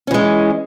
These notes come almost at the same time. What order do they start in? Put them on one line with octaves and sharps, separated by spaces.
C#4 E3 G#3